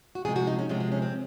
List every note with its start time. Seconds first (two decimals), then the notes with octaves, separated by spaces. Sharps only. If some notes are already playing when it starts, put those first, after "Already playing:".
0.15 F#4
0.25 C3 F3 G#3 G#4
0.36 F#4
0.47 D#4
0.58 C#4
0.69 C3 F3 G#3 C#4
0.80 C4
0.92 C#4
1.02 C4